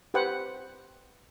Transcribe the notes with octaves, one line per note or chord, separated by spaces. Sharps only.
G4 B4 C5 F#5 G5